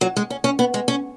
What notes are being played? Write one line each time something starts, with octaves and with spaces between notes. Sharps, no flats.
F#3
G#3
C#4
C#4
B3
G#3
C#4